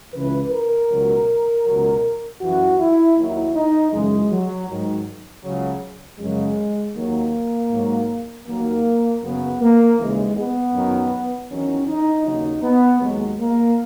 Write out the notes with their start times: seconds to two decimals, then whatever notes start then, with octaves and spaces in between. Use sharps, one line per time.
0.13 C#2 C#3 E3 B4
0.51 A#4
0.90 C#2 B2 F#3
1.65 C#2 B2 F#3
2.40 F#2 E3 F#4
2.79 E4
3.17 D#2 D#3 F#3 E4
3.54 D#4
3.92 F#2 C#3 E3 G#3
4.30 F#3
4.68 G#2 D#3 F#3
5.44 C#2 C#3 F#3
6.19 F#2 C#3 F#3 G#3
6.95 D#2 D#3 F#3 A#3
7.70 G#2 F#3
8.46 D#2 D#3 F#3 A#3
9.22 F#2 C#3 F#3 B3
9.60 A#3
9.98 D#2 C#3 E3 G#3
10.35 B3
10.73 F#2 D#3 F#3
11.49 E2 D#3 F#3 C#4
11.88 D#4
12.25 D#2 C#3 F#3 D#4
12.63 B3
13.01 D#2 D#3 F#3 G#3
13.39 A#3